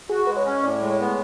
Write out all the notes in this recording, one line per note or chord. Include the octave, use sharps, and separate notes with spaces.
F#4 G#4
G#3 B4
C#5
C#4
A2 D5
G#3
C#5
B3